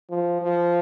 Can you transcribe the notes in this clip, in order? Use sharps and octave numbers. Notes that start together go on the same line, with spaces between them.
F3
F3